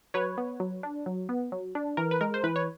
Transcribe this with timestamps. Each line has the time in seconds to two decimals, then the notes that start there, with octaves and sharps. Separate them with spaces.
0.14 F#3 B4 C#5
0.38 B3
0.60 F#3
0.83 D4
1.06 F#3
1.29 B3
1.52 F#3
1.75 D4
1.97 E3 A#4
2.11 B4
2.21 G#3 A#4
2.34 C5
2.44 E3 B4
2.56 C#5